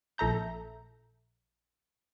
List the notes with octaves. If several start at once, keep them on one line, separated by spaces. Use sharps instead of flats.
A#1 A4 E5 A#5 G6